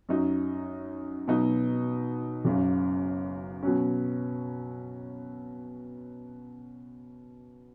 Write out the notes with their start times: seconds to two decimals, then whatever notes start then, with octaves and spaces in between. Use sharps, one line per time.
0.09 F#2 F#3 D#4
1.28 B2 F#3 D#4
2.45 F#1 F#2 C#3
3.63 B2 F#3 C#4